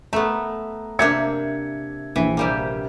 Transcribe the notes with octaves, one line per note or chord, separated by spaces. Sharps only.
A3 B3 A#5
C3 A#3 D4 E5 G#6 C#7
A#1 E3
C3 G3 A#3